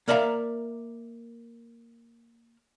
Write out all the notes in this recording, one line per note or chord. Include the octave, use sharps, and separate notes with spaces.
A#3 A#4 D5 E5 G#5 A#5